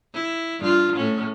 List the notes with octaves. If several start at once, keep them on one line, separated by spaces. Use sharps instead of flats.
E4
G2 F4
A2 C#4